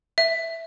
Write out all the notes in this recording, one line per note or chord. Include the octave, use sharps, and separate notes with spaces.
E5